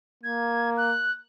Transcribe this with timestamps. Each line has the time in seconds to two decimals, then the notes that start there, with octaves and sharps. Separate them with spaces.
0.24 A#3 G#6
0.77 F#6